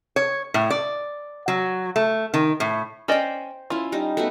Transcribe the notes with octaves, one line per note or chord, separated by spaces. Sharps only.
C#5
A2
D5
F#3
A3
D#3
A2
C#4 C5 D5 D#5 G5
C#4 E4 F4
G3 D#4
A3 B3 F#4